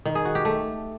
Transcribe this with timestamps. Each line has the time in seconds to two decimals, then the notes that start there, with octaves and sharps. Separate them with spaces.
0.05 D#3
0.15 G#4
0.25 F#4
0.35 G4
0.45 A3